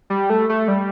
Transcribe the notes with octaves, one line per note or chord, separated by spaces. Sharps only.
G3
A3
A3
G3